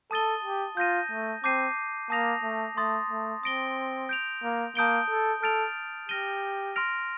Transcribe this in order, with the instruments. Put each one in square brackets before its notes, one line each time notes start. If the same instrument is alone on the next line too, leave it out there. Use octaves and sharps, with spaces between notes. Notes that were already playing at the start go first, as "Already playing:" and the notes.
[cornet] A4 [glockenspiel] A5 D#6 A6 D#7 G7
[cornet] G4
[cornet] F4 [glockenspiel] G6 A#6 D#7
[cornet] A3
[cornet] C4 [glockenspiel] A5 D6 G6 C7 D#7
[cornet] A#3 [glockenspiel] A5 D#6 A#6 F7
[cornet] A3
[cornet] A3 [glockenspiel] C6 D#6 A6
[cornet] A3
[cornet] C4 [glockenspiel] D#6 A#6 D7 G7
[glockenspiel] G6 D7 F7
[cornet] A#3
[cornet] A#3 [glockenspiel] A5 D#6 G6 D7 G7
[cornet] A4
[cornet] A4 [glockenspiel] F6 A6 D7 F7
[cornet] G4 [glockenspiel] F6 A#6 D#7 G7
[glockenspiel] C6 F6 A#6 D7 F7